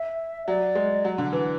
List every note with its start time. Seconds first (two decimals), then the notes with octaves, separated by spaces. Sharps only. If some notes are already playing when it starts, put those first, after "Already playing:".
Already playing: E5
0.47 F#3 D5
0.75 G#3
1.05 F#3
1.18 D3
1.33 E3